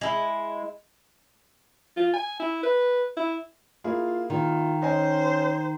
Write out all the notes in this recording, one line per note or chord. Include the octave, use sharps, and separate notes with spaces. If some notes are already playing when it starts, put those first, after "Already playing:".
G#3 E4
F4
G#5
E4
B4
E4
A#3 E4 F4 G#4
D#3 F4
C#4 C5 D#5 G#5